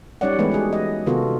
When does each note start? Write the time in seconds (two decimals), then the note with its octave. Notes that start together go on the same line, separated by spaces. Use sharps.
0.21 G3 C#4 D#4 C#5 D5 F#5
0.39 E3 G#3 A3 B3 G4 B4
0.52 F#4 G#4
0.73 D#5
1.06 C3 D#3 B3 F4 F#4 A4